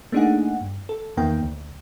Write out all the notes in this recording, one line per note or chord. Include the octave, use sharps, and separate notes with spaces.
A3 A#3 D4 D#4 G#4 F#5
G2
A4
E2 D#3 A#3 G5
D2